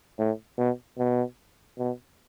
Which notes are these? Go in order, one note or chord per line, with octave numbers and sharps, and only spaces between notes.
A2
B2
B2
B2